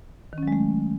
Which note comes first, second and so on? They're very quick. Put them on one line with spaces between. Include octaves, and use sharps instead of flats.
D#3 C#4 F#3 G#3 A3